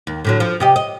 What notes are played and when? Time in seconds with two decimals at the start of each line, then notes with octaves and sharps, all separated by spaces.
0.07 D#2
0.25 A2 D3 F#3
0.40 F3
0.60 C3 G4 D#5
0.76 D#5